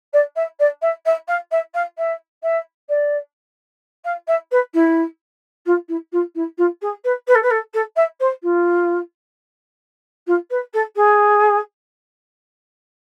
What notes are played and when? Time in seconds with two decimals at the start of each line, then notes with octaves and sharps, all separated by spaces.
0.13 D5
0.36 E5
0.59 D5
0.82 E5
1.05 E5
1.28 F5
1.51 E5
1.74 F5
1.98 E5
2.43 E5
2.89 D5
4.04 F5
4.27 E5
4.51 B4
4.74 E4
5.66 F4
5.88 E4
6.12 F4
6.35 E4
6.58 F4
6.81 G#4
7.04 B4
7.27 B4
7.35 A4
7.42 B4
7.50 A4
7.73 A4
7.96 E5
8.20 C5
8.43 F4
10.27 F4
10.50 B4
10.73 A4
10.96 G#4